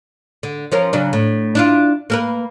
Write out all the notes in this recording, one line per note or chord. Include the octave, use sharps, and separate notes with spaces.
D3
F3 C#4 A#4
C#3 F#3 D4
A2
D4 E4 F4
A#3 A#4 B4